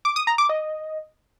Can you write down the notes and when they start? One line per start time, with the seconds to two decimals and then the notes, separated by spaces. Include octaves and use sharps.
0.05 D6
0.16 D#6
0.27 A#5
0.38 D6
0.49 D#5